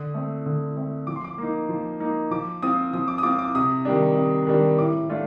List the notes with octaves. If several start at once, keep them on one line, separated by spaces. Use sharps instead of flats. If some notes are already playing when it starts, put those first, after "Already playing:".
Already playing: D3 D#6
A3 C4
D3
A3 C4
F3 D6
C6
D6
A#3 D#4
F3
A#3 D#4
F3 D6
C4 F4 D#6
F3 D#6
D6
D#6
C4 F4 D6
D6
C3 D#6
D#3 G3 D4
C3
D#3 G3 D4
A2 D6
A3 D4 F4